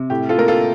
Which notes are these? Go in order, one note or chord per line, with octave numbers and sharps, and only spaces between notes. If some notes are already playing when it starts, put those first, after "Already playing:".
Already playing: C3
A2 G4
F4 A4
A#3 A#4
F4 A4